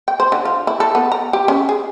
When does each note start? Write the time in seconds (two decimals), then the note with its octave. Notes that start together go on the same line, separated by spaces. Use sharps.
0.08 G5
0.20 C5
0.32 D3
0.45 F4
0.67 E4
0.80 A4
0.95 B3
1.12 A#5
1.33 G4
1.48 C#4
1.69 G#4